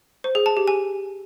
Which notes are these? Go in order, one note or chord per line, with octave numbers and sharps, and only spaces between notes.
C5
G#4
A5
G4
G#5